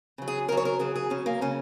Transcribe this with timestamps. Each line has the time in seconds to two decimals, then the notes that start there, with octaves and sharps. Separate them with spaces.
0.18 C#3 F#3
0.28 G#4
0.48 C#3 A#4
0.52 F#3
0.57 C#5
0.65 A#4
0.79 C#3 F#3 G#4
0.95 G#4
1.10 C#3 F#3 C#4
1.26 A#3
1.41 C#3 F#3 C#4